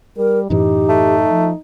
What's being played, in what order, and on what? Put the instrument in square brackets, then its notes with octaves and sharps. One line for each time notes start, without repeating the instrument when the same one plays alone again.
[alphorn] G3 [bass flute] A#4
[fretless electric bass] F#2 A2 E3 [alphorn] D#4 [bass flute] G4
[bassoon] A3
[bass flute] F3